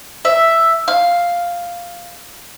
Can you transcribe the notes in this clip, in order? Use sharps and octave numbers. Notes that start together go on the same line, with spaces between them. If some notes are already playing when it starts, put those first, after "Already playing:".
E5
F5